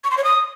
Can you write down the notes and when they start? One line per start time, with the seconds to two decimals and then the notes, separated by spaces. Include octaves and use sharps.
0.04 C#6
0.11 C6
0.17 C#5
0.24 D#6